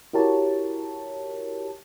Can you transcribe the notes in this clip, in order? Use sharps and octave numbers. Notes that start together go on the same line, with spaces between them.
E4 F#4 G4 A#4 C#5 A5